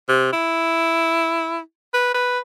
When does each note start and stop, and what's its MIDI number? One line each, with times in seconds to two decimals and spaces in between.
0.09 0.29 48
0.33 1.59 64
1.94 2.10 71
2.14 2.39 71